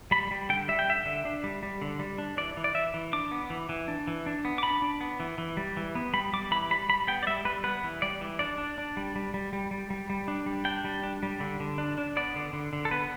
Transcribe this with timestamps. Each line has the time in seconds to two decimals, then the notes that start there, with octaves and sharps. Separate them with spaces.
0.11 G3 B5
0.31 G3
0.49 D3 G5
0.68 G3 E5
0.79 G5
0.87 D3 E5
1.06 D3
1.25 D4
1.44 G3
1.63 G3
1.82 D3
1.99 G3
2.18 D4
2.37 E3 D5
2.57 E3
2.64 D5
2.75 E3 E5
2.94 E3
3.13 D4 D6
3.31 B3
3.50 E3
3.69 E3
3.88 D4
4.08 E3
4.26 D4
4.45 B3
4.58 D6
4.63 D4 B5
4.82 D4
5.01 B3
5.20 E3
5.38 E3
5.57 G3
5.77 E3
5.95 B3
6.13 G3 B5
6.33 G3 D6
6.51 E3 B5
6.71 G3 B5
6.89 G3 B5
7.08 B3 G5
7.23 D5
7.27 G3 E5
7.45 G3 B4
7.64 B3 B4
7.84 E3
8.02 G3 D5
8.21 E3
8.39 D4 D5
8.58 D4
8.78 D4
8.97 G3
9.16 G3
9.34 G3
9.53 G3
9.71 G3
9.90 G3
10.10 G3
10.28 D4
10.46 G3
10.65 D4 G5
10.85 G3
11.03 D4
11.23 G3
11.40 D3
11.60 D3
11.78 D4
11.98 D4
12.17 B3 D5
12.36 D3
12.53 D3
12.73 D3
12.85 A4
12.91 B3 B4